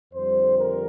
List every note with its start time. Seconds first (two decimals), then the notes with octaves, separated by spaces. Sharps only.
0.14 F2 D3 G3 C5
0.59 A#4